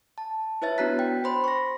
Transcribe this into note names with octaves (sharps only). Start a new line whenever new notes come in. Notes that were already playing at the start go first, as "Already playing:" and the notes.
A5
E4 B4 C#5 E5 A6
B3 D4 F#4 A#5 F#6 B6
G5
C5 B5 C6
C#6 A#6